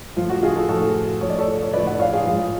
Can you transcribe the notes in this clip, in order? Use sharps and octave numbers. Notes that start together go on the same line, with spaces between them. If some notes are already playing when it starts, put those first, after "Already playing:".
A2 F3 F4
F#4
F4 G#4
F#4 A4
A2 F3 F#4 A4
A2 F3 C#5
D5
A4 C#5
C#5
A2 F3 B4 D5
D5 F#5
C#5 F5
F4 G#4
G#2 F3 F4